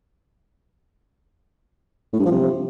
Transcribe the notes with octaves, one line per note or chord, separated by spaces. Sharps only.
A2
G2
F3
C3